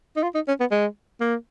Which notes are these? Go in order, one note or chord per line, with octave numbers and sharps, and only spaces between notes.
D#4
F4
D#4
C#4
B3
G#3
A#3